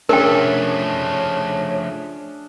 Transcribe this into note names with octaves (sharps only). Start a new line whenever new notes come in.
F3 A3 C#4 D4 G#4 A#4 C#5 G5